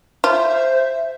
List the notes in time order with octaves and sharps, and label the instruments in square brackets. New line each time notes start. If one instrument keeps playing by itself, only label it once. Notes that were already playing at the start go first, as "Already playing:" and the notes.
[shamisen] F4 [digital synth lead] C5 [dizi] E5